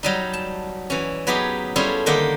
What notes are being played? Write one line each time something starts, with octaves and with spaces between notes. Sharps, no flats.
F#3 G3 D#4
A5
E3 C#4
F#3 B3 D#4 G4 G#4
G3 C#4 E4 F4 G#4 A4
D3 D#3 A#3 G4 D#5 F#5